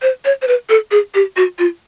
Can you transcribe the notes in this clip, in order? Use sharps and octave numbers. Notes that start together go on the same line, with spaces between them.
C5
C#5
C5
B4
A4
G#4
G4
F#4
F4